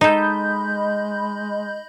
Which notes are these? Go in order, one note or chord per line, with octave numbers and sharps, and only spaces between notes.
G#3 D#4 A4 D#5 B5 G6